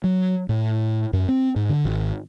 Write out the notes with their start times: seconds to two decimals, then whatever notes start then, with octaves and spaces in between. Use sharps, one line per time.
0.04 F#3
0.49 A2
1.13 F#2
1.29 C4
1.56 G#2
1.69 D3
1.85 G#1